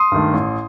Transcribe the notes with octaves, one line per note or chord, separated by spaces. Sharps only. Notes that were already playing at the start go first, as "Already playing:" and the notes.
Already playing: C6 D#6
G2 D#3 A3
A1